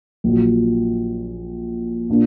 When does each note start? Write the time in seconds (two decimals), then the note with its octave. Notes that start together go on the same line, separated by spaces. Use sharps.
0.24 A#1 A#2 F#3
2.09 A#2 A#3 D4